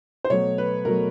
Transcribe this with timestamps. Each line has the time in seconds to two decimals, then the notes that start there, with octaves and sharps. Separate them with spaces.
0.24 C5
0.30 B2 F#3 A3 C#5
0.58 B4
0.85 B2 F#3 A3 A#4